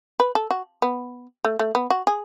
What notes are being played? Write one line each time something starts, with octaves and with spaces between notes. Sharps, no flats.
B4
A4
F#4
B3
A3
A3
B3
F#4
G#4